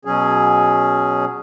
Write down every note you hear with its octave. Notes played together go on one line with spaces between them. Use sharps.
B2 F#3 C#4 G#4